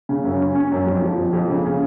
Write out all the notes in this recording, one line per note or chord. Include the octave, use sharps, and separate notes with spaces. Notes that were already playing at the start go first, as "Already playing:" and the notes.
C#3
F#2
C#4
C#4
F#2
F2
F3
F2
F2
C#3
C#3